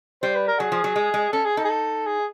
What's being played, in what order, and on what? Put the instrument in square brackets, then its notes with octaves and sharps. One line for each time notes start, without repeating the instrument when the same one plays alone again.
[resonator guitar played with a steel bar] G3 [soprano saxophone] C5
[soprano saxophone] B4
A#4
[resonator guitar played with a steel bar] F#3 [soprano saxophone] G#4
[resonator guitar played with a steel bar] F3
F#3
G#3
G#3
[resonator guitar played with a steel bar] C#4 [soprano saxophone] A4
[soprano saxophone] G#4
[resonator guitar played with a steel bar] D#4 [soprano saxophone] A4
[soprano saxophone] G#4
A4
G#4